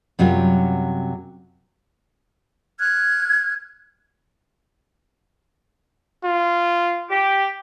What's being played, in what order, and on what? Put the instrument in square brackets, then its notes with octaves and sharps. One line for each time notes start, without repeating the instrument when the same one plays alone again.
[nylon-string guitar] F#2 C3 F#3 G3 F4
[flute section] F6 F#6 G#6
[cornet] F4
[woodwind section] G4